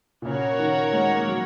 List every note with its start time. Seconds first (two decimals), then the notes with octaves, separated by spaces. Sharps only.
0.22 A#2
0.25 C#3 F#4 A#4 C#5 F#5
0.59 D#3
0.93 G#3
1.15 A#3
1.28 F#3